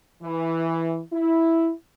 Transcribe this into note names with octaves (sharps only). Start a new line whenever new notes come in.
E3
E4